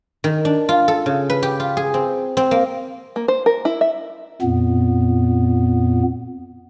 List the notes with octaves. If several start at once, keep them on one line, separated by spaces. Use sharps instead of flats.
D#3
D4
F4
A4
C#3
B4
G4
F4
G#4
C4
C4
A#3
A#3
C5
A#4
E4
E5
F2 A#2 B3